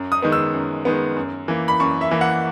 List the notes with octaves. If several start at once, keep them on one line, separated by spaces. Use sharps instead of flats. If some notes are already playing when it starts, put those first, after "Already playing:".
Already playing: F#2
D#6
D#3 G#3 B3
E6
F#2
D#3 G#3 B3
F#2
E3 A#3
B5
F#2 C#6
E5
E3 A#3
F#5